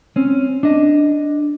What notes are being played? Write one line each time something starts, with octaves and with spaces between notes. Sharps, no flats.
C4 C#4
D4 D#5